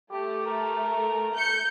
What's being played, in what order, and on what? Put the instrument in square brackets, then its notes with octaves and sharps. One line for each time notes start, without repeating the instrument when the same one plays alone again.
[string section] A3 [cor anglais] G4
[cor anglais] A#4
[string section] G6 C#7